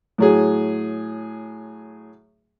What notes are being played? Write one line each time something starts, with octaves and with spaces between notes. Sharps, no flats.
A2 F#3 G#4